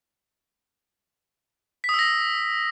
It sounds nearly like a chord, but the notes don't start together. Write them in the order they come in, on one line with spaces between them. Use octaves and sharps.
B6 D#6 E6 A#6